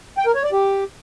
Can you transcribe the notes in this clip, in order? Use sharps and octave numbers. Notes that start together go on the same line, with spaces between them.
G5
A#4
C#5
D5
G4